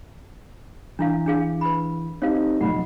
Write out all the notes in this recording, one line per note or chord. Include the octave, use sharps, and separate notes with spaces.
E3 D4 E4 F5
D4 G#4 F5
B4 B5
C4 D#4 G4 C#5 F5
B1 F2 F#5 B5